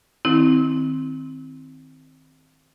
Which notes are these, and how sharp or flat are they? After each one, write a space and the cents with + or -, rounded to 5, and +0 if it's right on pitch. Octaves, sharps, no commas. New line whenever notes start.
D#3 +0 C4 +0 E4 -35